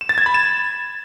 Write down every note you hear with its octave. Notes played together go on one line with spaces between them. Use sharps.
E7
A6
G#6
B5
E7